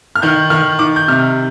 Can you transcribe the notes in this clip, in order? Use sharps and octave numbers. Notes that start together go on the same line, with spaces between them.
F6
D#3 G6
D#3 F6
D#3 D6
G6
C3 F6